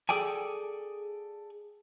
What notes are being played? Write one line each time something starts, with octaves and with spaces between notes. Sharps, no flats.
G#4 A4 D5 G5 G#5